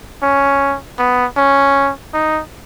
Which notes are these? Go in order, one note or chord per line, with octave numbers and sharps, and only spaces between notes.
C#4
B3
C#4
D#4